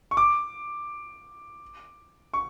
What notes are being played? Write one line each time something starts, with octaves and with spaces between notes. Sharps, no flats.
C#6
D6
C#6